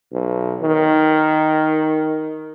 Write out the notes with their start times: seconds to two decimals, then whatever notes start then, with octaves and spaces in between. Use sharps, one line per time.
0.12 B1
0.62 D#3